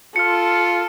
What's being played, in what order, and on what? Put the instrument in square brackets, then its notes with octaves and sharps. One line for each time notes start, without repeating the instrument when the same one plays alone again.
[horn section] F4 [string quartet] A4 [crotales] F6 C#7